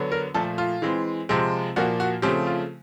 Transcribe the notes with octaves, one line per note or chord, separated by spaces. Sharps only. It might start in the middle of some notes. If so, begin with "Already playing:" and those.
Already playing: D3 F#3 B3
A#4
A#2 F3 A3 A4
F4
E3 G#3 C4
C3 F3 G#3 C4
A#2 F3 A#3 F#4
F#4
C#3 F3 A3 C4 G4
F4